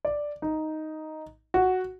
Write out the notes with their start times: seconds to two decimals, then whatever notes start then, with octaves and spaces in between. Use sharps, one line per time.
0.05 D5
0.42 D#4
1.54 F#4